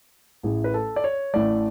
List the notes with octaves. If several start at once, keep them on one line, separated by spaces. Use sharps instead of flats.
A1 A2 E3 A3 G#4
B4
A4
D5
C#5
A1 A2 E3 A3 D5